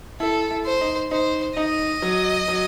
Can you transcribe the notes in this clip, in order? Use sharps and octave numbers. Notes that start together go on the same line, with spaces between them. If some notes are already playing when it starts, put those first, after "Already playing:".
E4 A4
E4
C5
D#4
D#4 C5
D#4 D#5
F#3
F#3